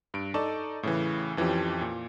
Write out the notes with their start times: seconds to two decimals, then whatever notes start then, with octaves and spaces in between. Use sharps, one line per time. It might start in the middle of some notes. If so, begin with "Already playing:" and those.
0.14 G2 D7
0.34 D#4 A4 D5 A5 C#6
0.83 A2 C#3 E3
1.37 F2 E3 F3 C#4 G4
1.82 A#2